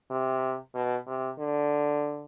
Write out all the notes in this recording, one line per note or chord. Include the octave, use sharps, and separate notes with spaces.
C3
B2
C3
D3